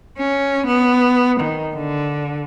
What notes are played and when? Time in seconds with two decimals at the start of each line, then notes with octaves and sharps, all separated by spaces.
0.18 C#4
0.67 B3
1.40 D#3
1.74 D3